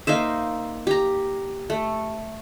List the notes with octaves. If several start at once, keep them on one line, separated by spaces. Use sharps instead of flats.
A#3 D#4 C5 E5
G4 A#5
A3